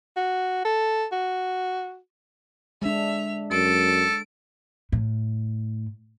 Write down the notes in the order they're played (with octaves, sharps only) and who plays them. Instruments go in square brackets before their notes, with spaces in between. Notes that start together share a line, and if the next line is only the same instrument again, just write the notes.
[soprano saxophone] F#4
A4
F#4
[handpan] G#3 D4 [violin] E5 F7
[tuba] F#2 [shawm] A4 [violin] D7
[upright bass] A2